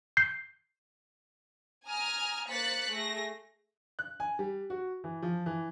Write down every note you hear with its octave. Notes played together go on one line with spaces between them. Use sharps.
G6 C7
G#5 A#5 D#6 F6
A#3 C5 F#6 A6 B6 C#7
A3 G#4 A#6
F#6
G#5
G3
F#4
E3
F3
E3